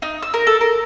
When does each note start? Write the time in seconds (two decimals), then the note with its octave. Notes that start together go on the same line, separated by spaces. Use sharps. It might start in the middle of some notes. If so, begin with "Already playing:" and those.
0.02 D#4
0.22 E6
0.34 A#4
0.47 A4
0.61 A#4